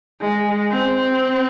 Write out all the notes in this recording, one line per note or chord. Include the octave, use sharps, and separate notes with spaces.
G#3
C4